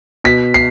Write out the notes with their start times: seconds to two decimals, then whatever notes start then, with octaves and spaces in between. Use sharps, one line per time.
0.24 B2 B6
0.54 C7